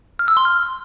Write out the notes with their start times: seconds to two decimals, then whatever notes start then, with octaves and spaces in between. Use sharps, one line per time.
0.19 F6
0.28 E6
0.37 C6
0.45 F6